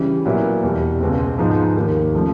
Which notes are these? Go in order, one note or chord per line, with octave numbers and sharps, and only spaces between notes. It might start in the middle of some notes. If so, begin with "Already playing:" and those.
Already playing: C#3 E3 G3
A#2 F#3 B3 E4
E2 B2 G3
C#2 B2 G#3 C4
G#2 F3 G#3 B3 D#4
D#2 D#3 G3 A#3
C#3 F3 A3